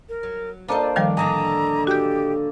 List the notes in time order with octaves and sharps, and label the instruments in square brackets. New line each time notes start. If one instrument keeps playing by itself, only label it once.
[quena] A#4
[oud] F#3
[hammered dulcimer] A#3 D4 [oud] F4 A4 D#5 [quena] C5
[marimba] D#3 F3 G3 [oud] F5
[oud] A2 D3 D4 [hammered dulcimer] D#5 G#5 [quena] A#5
[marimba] F#4 G6 [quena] G4